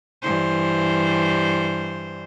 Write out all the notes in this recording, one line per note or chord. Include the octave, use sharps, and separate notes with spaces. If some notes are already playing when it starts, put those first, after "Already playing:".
G2 E3 C5